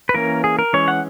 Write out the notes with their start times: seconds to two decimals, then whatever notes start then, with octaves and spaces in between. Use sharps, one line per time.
0.09 B4
0.14 E3 A#3 C#4 A#4
0.44 G#4
0.59 A#4
0.73 E3 G#3 C#4 C#5
0.88 F#5